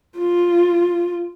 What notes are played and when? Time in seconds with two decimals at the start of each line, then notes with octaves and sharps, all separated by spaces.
0.18 F4